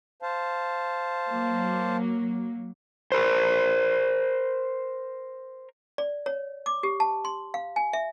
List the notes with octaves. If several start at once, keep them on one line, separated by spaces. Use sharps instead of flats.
C5 F5 A5
F#3 A#3
A#4 C5
D5
C#5
D6
G4
A5
C6
F5
G#5
E5